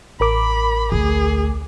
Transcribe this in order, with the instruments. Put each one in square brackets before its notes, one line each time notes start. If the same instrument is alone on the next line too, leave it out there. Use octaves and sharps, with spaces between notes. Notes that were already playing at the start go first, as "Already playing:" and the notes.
[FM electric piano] A1 A#4 D6 [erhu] B5
[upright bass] D2 [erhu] G#4